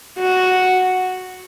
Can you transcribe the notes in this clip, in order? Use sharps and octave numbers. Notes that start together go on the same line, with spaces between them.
F#4